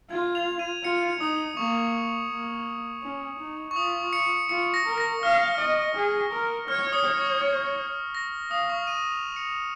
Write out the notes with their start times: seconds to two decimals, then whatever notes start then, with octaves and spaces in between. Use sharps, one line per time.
0.10 F4 G#6
0.35 F7
0.59 D#7
0.84 F4 C#7
1.20 D#4 D#6
1.57 A#3 C#6
2.30 A#3
3.03 C#4
3.40 D#4
3.71 C#6
3.76 F4 D#6
4.13 C#7
4.49 F4 C#7
4.74 A#6
4.86 A#4
4.98 A#6
5.22 F5 F6
5.59 D#5
5.96 G#4
6.32 A#4
6.68 C#5 F6
6.93 D#6
7.05 C#5
7.18 C#6
7.41 D#6
8.15 A#6
8.51 F5 D#6
8.70 C#6
8.87 D#7
9.12 F7
9.36 C#7